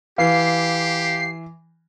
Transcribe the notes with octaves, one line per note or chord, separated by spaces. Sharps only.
E3 G4 F5 C7